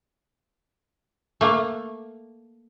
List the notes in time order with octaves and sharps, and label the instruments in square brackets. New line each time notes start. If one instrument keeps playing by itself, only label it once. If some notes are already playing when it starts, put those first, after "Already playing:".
[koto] A3 A#3